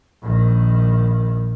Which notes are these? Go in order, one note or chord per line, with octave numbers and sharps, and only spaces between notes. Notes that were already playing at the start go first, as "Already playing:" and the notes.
A#1 D#3